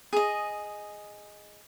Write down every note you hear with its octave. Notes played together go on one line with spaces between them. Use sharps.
G#4 D#5